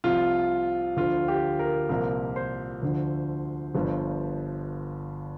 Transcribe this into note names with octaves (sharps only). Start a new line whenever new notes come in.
C2 C3 F3 F4
D2 D3 F3 F4
G4
A#4
C2 A#2 F3 A#4
C5
D2 D3 F3
G1 G2 F3